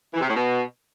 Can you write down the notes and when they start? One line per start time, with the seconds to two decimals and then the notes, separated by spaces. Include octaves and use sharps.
0.14 E3
0.21 C3
0.28 A2
0.35 B2